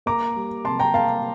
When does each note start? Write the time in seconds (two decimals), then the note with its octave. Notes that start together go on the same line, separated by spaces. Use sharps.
0.06 A#3 A#5 D6
0.35 G3
0.64 C3 A5 C6
0.79 G5 A#5
0.94 A#3 F5 A5